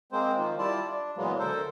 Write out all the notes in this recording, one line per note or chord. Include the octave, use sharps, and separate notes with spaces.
G#3 A#3 C4 C5
D#3 F3
G3 E4 F4 D5 A5
D4
A#2 E3 F#3 G#3 A#3 B3
D2 A4 A#4 C5